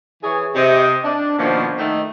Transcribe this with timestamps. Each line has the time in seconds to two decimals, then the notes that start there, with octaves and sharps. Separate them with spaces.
0.23 E3 G#4 C#5
0.55 C3 D#5
1.05 D4
1.38 B2 D#3 F3 A#3 C#4 D4
1.78 D#3 A3